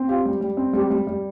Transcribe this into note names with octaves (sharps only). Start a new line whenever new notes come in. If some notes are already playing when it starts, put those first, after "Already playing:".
Already playing: C4
F4 G4
G3
G3
C4
G3 G4
G3
G3